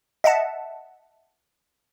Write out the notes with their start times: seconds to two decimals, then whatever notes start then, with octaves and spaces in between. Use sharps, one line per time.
0.24 D#5 E5 F#5 A5